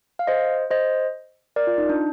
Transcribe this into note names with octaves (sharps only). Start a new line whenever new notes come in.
F5
C5 D#5
C5 D#5
A#4 D5
F4
D#4
D4